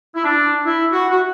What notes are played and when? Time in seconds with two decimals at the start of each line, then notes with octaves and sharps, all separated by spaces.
0.15 E4
0.24 D4
0.65 E4
0.92 F#4
1.10 F#4